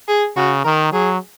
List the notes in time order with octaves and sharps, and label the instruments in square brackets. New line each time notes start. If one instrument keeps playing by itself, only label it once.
[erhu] G#4
[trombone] C#3 [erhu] F#4
[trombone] D#3 [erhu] A#4
[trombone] F#3 [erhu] G#4